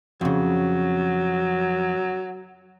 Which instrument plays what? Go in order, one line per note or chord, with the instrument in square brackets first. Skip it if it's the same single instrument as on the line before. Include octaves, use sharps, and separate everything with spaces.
[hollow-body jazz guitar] F2 C#3 [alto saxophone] F#3